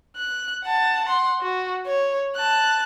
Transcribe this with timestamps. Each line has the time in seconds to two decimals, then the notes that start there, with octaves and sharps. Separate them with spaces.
0.17 F#6
0.64 F#5 A5
1.05 F#5 C6
1.41 F#4
1.86 C#5
2.36 A5 F#6